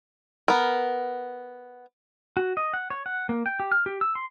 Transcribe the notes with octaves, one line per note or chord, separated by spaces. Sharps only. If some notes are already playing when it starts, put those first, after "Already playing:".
B3 A#4
F#4
D#5
F#5
C#5
F#5
A#3
G5
G4
F6
G4
E6
C6